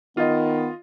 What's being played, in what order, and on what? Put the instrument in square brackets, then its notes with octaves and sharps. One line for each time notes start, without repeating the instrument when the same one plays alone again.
[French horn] D#3 [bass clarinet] B3 [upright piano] F4 D#5